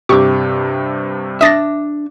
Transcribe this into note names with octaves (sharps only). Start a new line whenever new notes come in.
G2 C3 G4 C#6 D6
D4 E5 D#6 A6 A#6